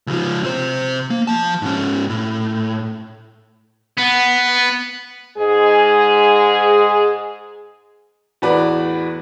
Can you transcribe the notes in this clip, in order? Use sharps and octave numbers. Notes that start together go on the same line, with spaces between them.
C#2 F3
C3 C5
A#3
F3 A5
G#2 C#4
A2
B3
G#2 G#3 G#4
E2 A2 F#4 B4 D5 B5